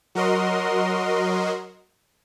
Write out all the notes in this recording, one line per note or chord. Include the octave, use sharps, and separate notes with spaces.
F#3 F#4 A#4 D#5 C6